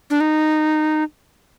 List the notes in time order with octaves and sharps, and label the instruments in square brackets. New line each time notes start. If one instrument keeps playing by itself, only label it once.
[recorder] D4
D#4